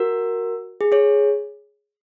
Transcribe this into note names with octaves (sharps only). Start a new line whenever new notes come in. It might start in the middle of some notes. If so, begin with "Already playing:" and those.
Already playing: F#4 A#4
G#4
G#4 C#5